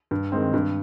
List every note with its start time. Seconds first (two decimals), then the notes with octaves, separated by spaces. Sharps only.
0.11 G2
0.32 D#3 G#3 C4
0.54 G2